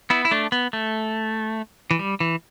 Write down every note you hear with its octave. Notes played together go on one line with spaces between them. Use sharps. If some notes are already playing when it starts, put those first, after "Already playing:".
B3 E4
E4
A3 D4
B3
A3
E3
G3
E3